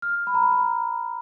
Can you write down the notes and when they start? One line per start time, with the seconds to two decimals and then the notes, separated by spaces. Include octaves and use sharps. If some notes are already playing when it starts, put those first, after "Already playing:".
0.02 F6
0.27 B5
0.35 A#5
0.43 B5
0.52 A#5